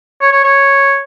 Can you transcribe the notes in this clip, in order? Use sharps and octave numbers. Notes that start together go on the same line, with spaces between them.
C#5
C#5
C#5